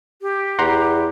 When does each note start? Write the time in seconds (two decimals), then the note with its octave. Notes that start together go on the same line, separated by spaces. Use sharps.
0.22 G4
0.59 E2 F#5 A#5 C6